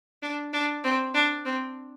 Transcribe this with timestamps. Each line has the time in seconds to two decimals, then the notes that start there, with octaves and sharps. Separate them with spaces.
0.23 D4
0.53 D4
0.84 C4
1.15 D4
1.45 C4